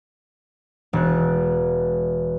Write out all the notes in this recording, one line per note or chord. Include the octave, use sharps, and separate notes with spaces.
E1 F#6